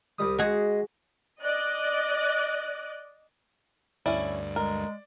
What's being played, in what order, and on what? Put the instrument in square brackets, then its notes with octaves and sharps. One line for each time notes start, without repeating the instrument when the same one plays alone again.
[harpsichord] C2 G3 D#6
[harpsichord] G#3 [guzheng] F#4 G#4
[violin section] D5 D#5 F#6
[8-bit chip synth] D2 G2 [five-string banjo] C#4 E4 [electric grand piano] D5
[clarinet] G#3 [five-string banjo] A#4